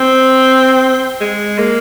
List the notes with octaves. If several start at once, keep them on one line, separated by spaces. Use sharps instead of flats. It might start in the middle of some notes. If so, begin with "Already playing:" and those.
Already playing: C4
G#3
A#3